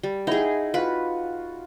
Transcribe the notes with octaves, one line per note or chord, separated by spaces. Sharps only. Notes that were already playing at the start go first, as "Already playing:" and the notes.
G3
D#4 E4 G#4 F#5 G5
F4 F#4 B4